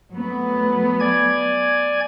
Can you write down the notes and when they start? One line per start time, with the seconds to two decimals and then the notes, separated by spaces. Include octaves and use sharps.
0.12 F#3 A3 B3
1.00 D5 G#5 G#6